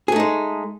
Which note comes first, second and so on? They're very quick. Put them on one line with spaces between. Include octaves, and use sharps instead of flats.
G#4 A3 D#4 G#3